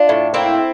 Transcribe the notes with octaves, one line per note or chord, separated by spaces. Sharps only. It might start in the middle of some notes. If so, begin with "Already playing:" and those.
Already playing: D4 F4
A2
A#3 C4 E4